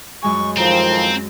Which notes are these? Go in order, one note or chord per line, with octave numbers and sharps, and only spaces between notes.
F#2 G#3 G#5 C#6
A2 D#3 F3 C4 A#5